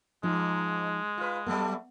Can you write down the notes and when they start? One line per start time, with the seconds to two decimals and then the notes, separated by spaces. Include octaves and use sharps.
0.23 G#2 F3 G#3 D#4
1.17 F4 B4
1.46 F#3 G3 A3 B3